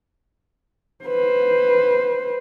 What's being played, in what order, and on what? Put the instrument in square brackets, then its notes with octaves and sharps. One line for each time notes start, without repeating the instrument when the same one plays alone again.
[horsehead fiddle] B4 C5